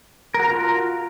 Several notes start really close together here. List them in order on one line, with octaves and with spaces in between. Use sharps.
A#4 F#4 A#5 F4